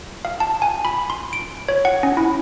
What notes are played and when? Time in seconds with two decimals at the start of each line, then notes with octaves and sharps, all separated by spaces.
0.25 F5
0.40 A5
0.62 G#5
0.85 B5
1.10 C6
1.33 D7
1.68 C#5
1.85 F#5
2.03 C#4
2.17 E4